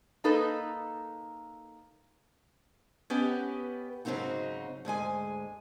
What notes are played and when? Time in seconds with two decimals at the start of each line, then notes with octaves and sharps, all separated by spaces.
0.24 A#3 D#4 A4 B4
3.10 B3 C#4 G4 B4 D#5
4.05 G#2 C#3 F#3 C4 D#4 F#4
4.85 D2 G#2 G#3 G#5